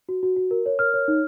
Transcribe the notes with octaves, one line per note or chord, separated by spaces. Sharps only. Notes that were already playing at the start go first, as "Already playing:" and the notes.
F#4
F#4
F#4
A#4
C#5
A#4 F6
C#5
D#4